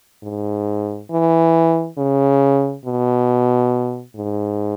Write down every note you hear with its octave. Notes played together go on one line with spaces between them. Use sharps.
G#2
E3
C#3
B2
G#2